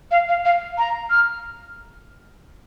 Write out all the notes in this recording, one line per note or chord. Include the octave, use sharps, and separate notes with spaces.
F5
F5
F5
A#5
F6